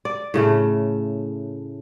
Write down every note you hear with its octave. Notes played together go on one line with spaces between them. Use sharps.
D5
A2 C#3 A3